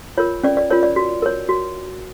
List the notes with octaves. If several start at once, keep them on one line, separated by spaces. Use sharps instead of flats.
F4 A#4 C#5
C#4 D5
D5
F4 A#4 C#5
D5
F#4
A#4 C#5
F#4